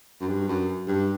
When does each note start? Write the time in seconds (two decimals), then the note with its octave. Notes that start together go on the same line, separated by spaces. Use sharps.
0.21 F#2
0.29 G2
0.48 F#2
0.88 G2